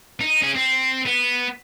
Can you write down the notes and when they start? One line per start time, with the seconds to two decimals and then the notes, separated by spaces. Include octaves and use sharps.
0.21 D#4
0.43 C#4 G#4
0.56 C4
1.06 B3